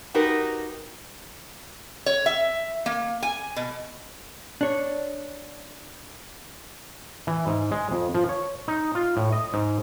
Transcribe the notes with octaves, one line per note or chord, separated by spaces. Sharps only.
D#4 F#4 G4 A#4 B4
C#5
E5
A#3
G#5
B2
D4 C#5
E3
G#2
G#3
F2
F3
C#5
D#4
F4
A2
D#5
G#2